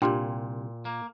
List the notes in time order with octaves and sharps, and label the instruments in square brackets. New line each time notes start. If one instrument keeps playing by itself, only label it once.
[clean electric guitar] C2 [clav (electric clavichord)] A#2 [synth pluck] D4 F4 G4 [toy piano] G5 C6
[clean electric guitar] A#3